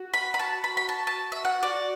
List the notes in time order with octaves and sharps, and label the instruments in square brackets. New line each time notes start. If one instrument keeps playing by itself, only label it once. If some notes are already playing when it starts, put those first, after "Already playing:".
Already playing: [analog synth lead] F#4
[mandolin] B5
B5
A5
B5
B5
A5
A5
E5
F#5
[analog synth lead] F#4 [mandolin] D5